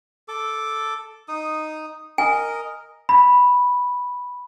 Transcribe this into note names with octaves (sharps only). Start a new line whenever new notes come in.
A4 D6
D#4 D#6
A#4 D#5 G#5
B5